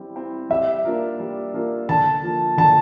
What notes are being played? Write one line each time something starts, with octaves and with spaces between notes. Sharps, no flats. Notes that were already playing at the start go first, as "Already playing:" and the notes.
Already playing: G3 C4 E4
C4 E4
G3 E5
A#3 D4 F4 A#4
G3
A#3 D4 F4 A#4
D3 A5
F3 A#3 F4
D3 A5